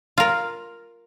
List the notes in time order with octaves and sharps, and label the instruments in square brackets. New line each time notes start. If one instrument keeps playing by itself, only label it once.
[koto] F4 A#4